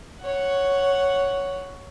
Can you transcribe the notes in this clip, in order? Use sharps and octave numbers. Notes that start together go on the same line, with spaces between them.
C#5 F#5